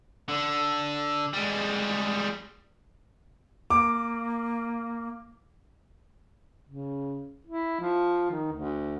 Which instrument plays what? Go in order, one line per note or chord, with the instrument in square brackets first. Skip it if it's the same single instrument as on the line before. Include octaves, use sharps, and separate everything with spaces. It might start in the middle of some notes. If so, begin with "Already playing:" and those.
[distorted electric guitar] D3
G3 G#3
[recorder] A#3 [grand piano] D6
[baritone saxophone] C#3
E4
F3
D#3
D2